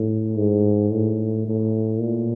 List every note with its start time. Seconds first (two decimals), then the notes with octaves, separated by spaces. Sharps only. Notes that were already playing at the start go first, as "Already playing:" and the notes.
Already playing: A2
0.37 G#2
0.91 A2
1.46 A2
2.00 A#2